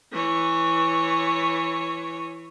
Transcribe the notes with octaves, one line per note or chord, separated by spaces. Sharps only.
E3 C#5